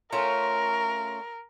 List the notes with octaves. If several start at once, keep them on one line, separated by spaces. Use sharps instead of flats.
A3 C#4 F4 A#4